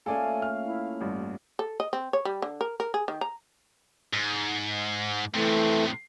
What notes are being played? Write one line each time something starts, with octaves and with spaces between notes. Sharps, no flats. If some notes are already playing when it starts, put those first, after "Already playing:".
A#2 A3 C#4 A4 D5 F5 G#5
F6
E4
A1 G2
A4
D#5
C4
C#5
G3
D3
A#4
A#4
G#4
D#3
A#5
G#2
A2 C3 E3 A3